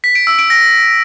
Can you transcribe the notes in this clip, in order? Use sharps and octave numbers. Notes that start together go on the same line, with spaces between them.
B6
D7
E6
D7
A#6